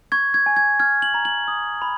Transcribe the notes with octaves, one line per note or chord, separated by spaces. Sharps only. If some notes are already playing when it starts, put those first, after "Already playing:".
C#6 G#6
G#6
G#5
G#6
F6 G#6
F#7
A#5
F#7
D#6
B5